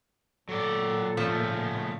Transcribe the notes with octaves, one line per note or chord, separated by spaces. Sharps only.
A#2 F#3 A4 D5
C#3 F3 A3